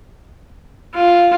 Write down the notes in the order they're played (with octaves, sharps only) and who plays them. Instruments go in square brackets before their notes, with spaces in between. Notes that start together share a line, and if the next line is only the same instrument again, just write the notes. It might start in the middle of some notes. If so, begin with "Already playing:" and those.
[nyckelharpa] F4